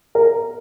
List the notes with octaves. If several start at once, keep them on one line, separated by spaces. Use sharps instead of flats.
A#4